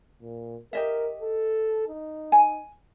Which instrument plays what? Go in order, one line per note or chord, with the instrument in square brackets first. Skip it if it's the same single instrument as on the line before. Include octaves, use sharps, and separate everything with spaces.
[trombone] A#2
[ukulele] G4 D#5 E5 [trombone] A#4
[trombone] A4
D#4
[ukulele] G#5